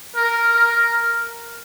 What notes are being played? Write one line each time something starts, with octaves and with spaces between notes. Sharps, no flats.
A#4
A#4